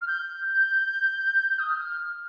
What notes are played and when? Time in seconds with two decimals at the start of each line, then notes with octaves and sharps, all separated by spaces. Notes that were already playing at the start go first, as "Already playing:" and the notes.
0.01 F6
0.07 G6
1.59 D#6
1.68 F6